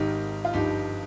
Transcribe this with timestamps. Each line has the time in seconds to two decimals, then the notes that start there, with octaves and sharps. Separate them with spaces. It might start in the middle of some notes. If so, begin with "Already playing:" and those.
Already playing: G#1 G#2 D#3 D#4 G4
0.45 F4
0.53 G1 G2 F3 D#4 G4